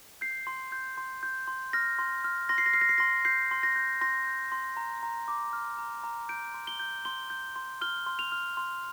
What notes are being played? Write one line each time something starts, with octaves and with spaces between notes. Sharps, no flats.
G6 C7
C6
G6
C6
G6
C6
F6 A#6
C6
F6
C6 A#6
C7
A#6
F6 C7
A#6
C7
C6 A#6
G6 C7
C6
A#6
G6
C6 A#6
G6
C6
A#5
A#5
D6
F6
A#5
A#5
G6 D7
C6
G7
G6
C6 G7
G6
C6
F6 G7
C6
F7
F6
C6